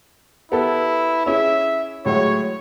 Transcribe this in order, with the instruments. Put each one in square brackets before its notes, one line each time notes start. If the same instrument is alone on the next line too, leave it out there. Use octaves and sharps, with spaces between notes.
[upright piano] B3 G4 A4 [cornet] E4
[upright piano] C#4 E4 G#4 [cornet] E5
[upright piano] A2 F#3 G#3 [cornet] C#5